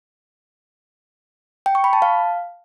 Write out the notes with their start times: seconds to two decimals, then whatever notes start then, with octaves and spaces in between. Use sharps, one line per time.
1.66 G5
1.75 C#6
1.84 B5
1.93 A5
2.02 F5